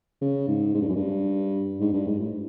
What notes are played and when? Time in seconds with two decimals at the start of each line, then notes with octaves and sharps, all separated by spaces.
0.21 C#3
0.48 G#2
0.74 G#2
0.81 G2
0.88 F#2
0.96 G2
1.80 G#2
1.93 G2
2.07 G#2
2.20 A2